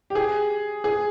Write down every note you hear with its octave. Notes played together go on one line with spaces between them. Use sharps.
G4
G#4
G#4